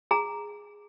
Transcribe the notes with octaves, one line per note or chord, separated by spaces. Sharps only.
G#4 A#5